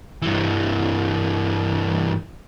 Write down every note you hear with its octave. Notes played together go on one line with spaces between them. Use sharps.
G2 E3